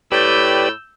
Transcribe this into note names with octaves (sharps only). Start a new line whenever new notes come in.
A2 G4 B4 D5 E6 G6